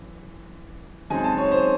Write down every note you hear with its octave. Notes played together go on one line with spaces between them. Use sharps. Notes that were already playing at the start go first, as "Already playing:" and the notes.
Already playing: F#2 E3
F#2 C#3 G#3 C4 D#4 G#5
A5
C#5
C5